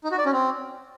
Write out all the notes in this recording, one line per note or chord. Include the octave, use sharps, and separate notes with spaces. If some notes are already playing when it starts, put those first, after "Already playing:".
D#4
F#4
D5
C#4
C4